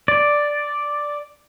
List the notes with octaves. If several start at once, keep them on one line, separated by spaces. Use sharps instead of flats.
D5